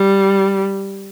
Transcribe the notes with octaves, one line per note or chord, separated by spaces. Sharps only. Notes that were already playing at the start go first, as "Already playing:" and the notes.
Already playing: G3